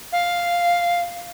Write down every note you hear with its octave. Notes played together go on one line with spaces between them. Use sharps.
F5